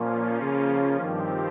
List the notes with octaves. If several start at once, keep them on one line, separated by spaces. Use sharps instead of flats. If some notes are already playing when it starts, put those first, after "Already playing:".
Already playing: A#2 F3 A#3 C#4 F4
C#3
G2 D#3 F3 C4 G4